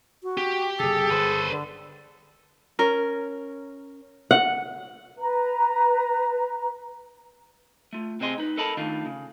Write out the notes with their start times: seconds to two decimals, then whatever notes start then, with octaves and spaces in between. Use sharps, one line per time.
0.23 F#4
0.37 G4
0.80 F#1 C3 G#4 A4
1.11 G1 B4 C5
1.49 D3
2.79 C#4 A#4
4.31 F#5
5.19 B4 A#5
7.93 A3 F4
8.20 C3 C4 G#4 D#5 C6
8.38 D#4 B4
8.58 A4 A#4 D#5 A5 B5
8.77 D#3 A3 D4 D#4 F4
9.06 C#3